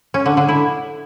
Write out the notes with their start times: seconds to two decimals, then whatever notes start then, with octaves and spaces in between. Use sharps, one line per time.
0.14 C#4
0.26 D3
0.37 D3
0.49 E4